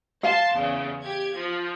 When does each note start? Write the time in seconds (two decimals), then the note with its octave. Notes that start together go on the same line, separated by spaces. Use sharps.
0.23 F5 A5 C6
0.56 E2 C#3
1.03 G4 G#6
1.36 F3